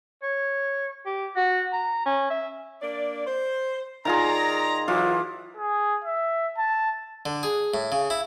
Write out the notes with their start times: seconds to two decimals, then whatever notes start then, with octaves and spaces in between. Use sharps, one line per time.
0.23 C#5
1.06 G4
1.36 F#4
1.72 A#5
2.06 C#4
2.30 E5
2.81 A#3 D4 D5
3.26 C5
4.05 D#3 F4 G#4 D5 A#5
4.88 E3 F#3 F4 D6
5.57 G#4
6.04 E5
6.58 A5
7.26 D3
7.43 G#4
7.74 A2
7.92 C#3
8.10 E4